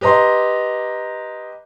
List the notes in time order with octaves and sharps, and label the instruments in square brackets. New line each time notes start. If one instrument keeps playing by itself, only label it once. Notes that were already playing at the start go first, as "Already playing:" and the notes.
[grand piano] G4 B4 D#5 A#5 C6